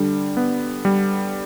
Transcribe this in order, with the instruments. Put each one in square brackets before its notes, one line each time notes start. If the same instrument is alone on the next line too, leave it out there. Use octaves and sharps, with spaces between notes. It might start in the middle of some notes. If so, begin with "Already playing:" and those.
Already playing: [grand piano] D3 [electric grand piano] G3
[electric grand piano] B3
G3